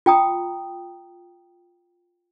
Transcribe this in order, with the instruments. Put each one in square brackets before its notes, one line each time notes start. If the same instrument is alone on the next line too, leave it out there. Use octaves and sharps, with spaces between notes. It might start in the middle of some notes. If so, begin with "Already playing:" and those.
[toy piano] F4 G5 A#5 D#6